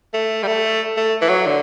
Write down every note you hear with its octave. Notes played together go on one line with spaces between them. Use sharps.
A3
G3
A3
A3
E3
F#3
D3